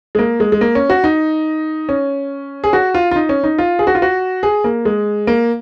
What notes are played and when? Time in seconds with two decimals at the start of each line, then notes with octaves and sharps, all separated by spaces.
0.15 G#3
0.19 A#3
0.40 G#3
0.52 G#3
0.61 A#3
0.75 C#4
0.90 F#4
1.04 D#4
1.89 C#4
2.64 G#4
2.73 F#4
2.95 F4
3.11 F4
3.16 D#4
3.29 C#4
3.44 D#4
3.58 F4
3.79 G#4
3.87 F#4
3.95 F4
4.02 F#4
4.43 G#4
4.64 A#3
4.85 G#3
5.27 A#3